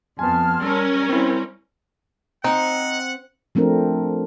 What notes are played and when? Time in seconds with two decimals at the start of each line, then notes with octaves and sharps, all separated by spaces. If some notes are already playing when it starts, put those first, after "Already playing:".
0.19 F2 B3 G#5 A5 C6 F6
0.63 G3 C#4 A#4 E6
1.09 C4 E4 C5
2.44 C4 D#4 F#5
3.55 F3 A3 C4 D4 A#4